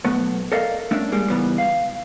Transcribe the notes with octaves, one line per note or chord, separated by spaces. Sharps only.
B1 A3 B3
A4 A#4 D5 D#5 F5
A3 C#4 D4
G3 G#3 A#3
C#2 G#2 E3 G3 B3
F5